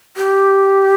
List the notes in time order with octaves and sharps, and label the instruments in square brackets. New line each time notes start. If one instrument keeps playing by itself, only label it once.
[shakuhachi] G4